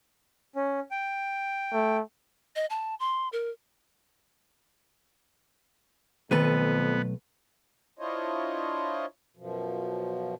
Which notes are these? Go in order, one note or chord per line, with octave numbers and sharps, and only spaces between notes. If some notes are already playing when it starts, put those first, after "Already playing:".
C#4
G5
A3
D#5
A5
C6
A#4
B1 F2 D#3 A3 B3 B4 A6 D#7
D4 E4 F4 C5 C#5 D#5
F#2 B2 F3